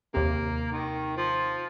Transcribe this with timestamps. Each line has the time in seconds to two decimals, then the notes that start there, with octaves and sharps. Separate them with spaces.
0.14 D#2 C3 A#3
0.72 D#3
1.17 F3